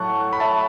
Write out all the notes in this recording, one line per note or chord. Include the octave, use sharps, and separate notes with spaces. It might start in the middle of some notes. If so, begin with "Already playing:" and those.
Already playing: A2 F#3 C#5 F#5 A5 C#6
B5
E5 A5